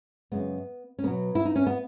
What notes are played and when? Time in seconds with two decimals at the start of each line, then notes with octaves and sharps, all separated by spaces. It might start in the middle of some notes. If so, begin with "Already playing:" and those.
0.32 F#2 C#3 G#3 B3
0.99 C#4
1.04 B2 F#3 B3
1.35 E4
1.45 D#4
1.56 C#4
1.67 B3